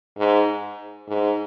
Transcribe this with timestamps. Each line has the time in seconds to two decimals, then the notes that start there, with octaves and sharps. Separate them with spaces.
0.18 G#2
1.08 G#2